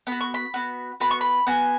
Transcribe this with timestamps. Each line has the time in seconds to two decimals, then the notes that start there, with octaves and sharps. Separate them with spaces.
0.07 B3 F#4 B5
0.21 C#6
0.34 B5
0.54 B3 F#4
1.00 B3 F#4 B5
1.11 C#6
1.21 B5
1.47 B3 F#4 G#5